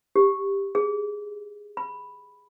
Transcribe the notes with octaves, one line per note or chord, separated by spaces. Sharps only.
G4
G#4
B5